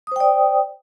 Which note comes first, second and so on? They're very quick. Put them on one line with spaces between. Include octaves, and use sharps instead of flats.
D#6 C5 G5 D5